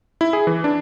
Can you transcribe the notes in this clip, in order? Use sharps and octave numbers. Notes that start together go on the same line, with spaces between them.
E4
G#4
E3
D4